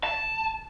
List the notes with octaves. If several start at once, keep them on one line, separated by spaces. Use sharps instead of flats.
A5